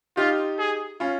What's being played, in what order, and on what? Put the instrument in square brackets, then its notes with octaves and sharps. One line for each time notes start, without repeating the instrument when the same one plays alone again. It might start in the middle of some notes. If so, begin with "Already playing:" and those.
[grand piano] D#4 G4 [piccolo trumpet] F4
[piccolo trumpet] G#4
[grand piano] C#4 F4